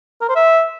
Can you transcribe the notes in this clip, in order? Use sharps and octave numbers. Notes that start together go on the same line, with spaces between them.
A#4
C5
E5